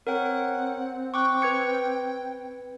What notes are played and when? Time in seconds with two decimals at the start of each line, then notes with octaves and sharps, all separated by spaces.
0.07 C4 A#4 C#5 F#5 G5
1.14 G5 C#6 D6 F#6
1.42 B4 G#6 C#7